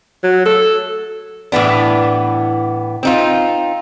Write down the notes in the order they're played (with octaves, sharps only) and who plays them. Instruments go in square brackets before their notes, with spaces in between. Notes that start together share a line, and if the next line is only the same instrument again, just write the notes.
[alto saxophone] F#3
A4
[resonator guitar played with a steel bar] A2 E3 B3 D4
C4 D#4 F4